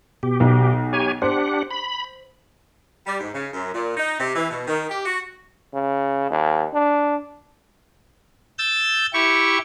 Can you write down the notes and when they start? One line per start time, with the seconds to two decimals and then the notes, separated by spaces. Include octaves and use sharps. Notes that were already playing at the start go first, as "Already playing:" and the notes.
0.23 B2 G4
0.40 B1
0.93 G4 C#5 G#5
1.22 D4 G4 C5 F#5
1.71 B5
3.06 G3
3.20 G#2
3.32 C#3
3.53 F#2
3.74 A#2
3.97 D#4
4.19 C3
4.35 E3
4.50 B2
4.67 D#3
4.89 G4
5.05 F#4
5.74 C#3
6.30 D#2
6.74 D4
8.58 E6 G6 A6
9.13 E4 G4 C#6